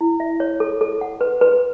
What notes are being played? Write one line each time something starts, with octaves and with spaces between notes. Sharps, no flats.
E4
E5
C#5
A4
A4
F#5
B4
B4